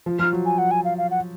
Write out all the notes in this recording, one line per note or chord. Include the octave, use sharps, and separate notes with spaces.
F3
F3 F6
F#3
G#5
F#5
G#5
F5
F5
F#5